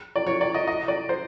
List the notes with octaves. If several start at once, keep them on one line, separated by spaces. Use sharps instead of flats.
D5
C#5
D5
D#5
D#5
D5
C5